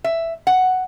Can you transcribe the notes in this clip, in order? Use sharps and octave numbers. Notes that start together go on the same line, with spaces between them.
E5
F#5